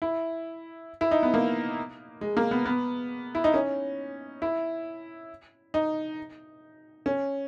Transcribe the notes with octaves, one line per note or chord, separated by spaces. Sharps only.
E4
E4
D#4
B3
A#3
G#3
A#3
B3
B3
E4
D#4
C#4
E4
D#4
C#4